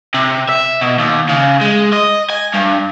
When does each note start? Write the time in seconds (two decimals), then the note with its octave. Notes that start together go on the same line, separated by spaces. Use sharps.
0.14 C3
0.49 E5
0.81 B2
0.98 D#2
1.29 C#3
1.61 G#3
1.92 D#5
2.30 G#5
2.54 G2